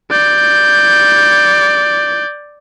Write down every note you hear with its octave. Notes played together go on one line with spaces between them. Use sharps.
D5 G6